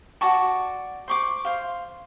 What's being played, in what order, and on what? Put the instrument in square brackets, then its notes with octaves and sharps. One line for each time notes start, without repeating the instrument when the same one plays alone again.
[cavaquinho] F#4 D5 A5 C#6
C5 C#6 D6
C5 F5